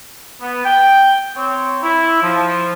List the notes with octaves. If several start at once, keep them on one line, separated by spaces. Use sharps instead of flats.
B3
G5
C4 C#5
E4
F3